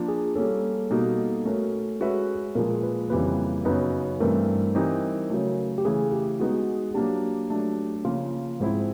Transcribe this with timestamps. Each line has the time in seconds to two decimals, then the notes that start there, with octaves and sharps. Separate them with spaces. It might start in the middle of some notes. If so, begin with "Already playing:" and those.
Already playing: F3 A#3 D4
0.08 G#4
0.36 G3 A#3 C#4 A4
0.90 B2 G3 A#3 D#4 F#4
1.45 A3 C#4 F#4 A#4
2.00 G#3 C#4 F#4 B4 E5
2.55 A#2 F3 G#3 A#4
2.83 B4
3.10 F2 C#3 E3 G3 A#3 B4
3.65 F#2 C#3 F#3 B3 D#4 B4
4.20 G2 E3 A3 C4 A#4
4.75 E3 G3 C4 D#4
5.30 C#3 F#3 A3
5.78 G4
5.85 C#3 E3 A3 C#4 G#4
6.12 G4
6.40 G#3 B3 D#4 F#4
6.94 F#3 A#3 D4 G4
7.50 F#3 A3 D4
8.05 C#3 F3 A#3 F4
8.60 G#2 F3 G#3 C4 E4